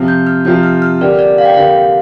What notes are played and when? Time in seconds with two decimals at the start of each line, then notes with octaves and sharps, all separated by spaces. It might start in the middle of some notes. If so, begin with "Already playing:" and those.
Already playing: C3 F3 C4 F4
0.08 G6
0.27 F6
0.45 C3 F3 C4 F4 G6
0.63 F6
0.82 F6
1.01 D3 A#3 G4 D5
1.19 D5
1.38 F5
1.45 G5
1.54 D3 A#3 G4 F5